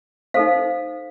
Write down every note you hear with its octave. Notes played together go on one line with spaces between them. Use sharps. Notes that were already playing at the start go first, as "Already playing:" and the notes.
D#4 A4 C5 F5